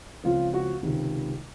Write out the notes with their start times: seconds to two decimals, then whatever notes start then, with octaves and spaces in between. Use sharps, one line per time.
0.24 C#2 C#3 F3 C4 F4
0.54 F#4
0.83 C#2 C3 D#3